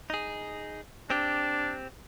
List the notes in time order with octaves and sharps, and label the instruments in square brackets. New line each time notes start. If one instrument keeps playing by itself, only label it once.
[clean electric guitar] D#4 G#4
[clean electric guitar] C4 G4 [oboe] D4